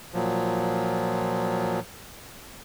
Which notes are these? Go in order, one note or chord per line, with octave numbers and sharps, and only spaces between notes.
A#2 F3 F#3